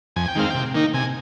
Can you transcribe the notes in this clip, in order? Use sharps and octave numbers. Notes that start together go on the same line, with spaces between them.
F2 G#5
G5
D#3 G#3 C4 F5
C3 G5
D#3 A#3 D#4
C3 G#5